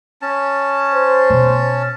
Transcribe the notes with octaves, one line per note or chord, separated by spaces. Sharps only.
C#4 A5
C5
B2